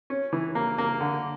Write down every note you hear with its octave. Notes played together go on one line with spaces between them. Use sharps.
C#4
E3
A#3
A#3
D3